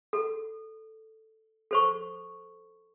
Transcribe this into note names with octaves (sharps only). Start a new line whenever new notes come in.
A4
A4 C5 C#6